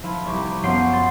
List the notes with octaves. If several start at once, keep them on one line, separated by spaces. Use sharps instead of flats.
F3 E4
C2 C#6 D6
F#2 F3 B3 C6 C7 D7
C6 A6